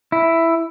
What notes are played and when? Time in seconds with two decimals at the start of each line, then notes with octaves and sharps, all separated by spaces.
0.12 E4